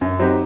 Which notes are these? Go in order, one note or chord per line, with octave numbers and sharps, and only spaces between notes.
F#2
F#3 C4 D#4 G4